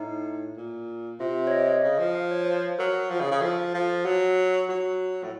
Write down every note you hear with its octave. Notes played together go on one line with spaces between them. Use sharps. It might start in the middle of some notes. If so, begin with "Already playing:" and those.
Already playing: A2 D#4
A#2
C3 F4
C#5
D#5
D#5
C#3
F3
F5
C#5
C5
F#3 A#4
F3
C#3
C#3
F3 A4
F3
F#3 F#4
F#3 F#4
A2